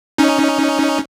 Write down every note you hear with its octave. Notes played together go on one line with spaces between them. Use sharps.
C#4 D#4